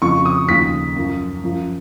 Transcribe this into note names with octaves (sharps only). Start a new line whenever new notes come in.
F2 C#3 F3 C#6
D#6
D#2 C#3 F3 B6
F#2 F3
F#2 F3